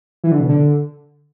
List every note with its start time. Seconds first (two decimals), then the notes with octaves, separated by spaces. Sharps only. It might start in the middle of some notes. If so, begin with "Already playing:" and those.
0.24 E3
0.31 D3
0.40 B2
0.49 D3